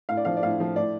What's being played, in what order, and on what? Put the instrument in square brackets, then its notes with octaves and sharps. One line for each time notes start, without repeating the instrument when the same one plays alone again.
[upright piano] A2 F5
D5
F3 F5
D5
A2 F5
F3
A2 D5